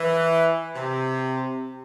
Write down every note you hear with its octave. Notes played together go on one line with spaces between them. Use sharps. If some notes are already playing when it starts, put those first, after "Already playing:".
Already playing: E3
C3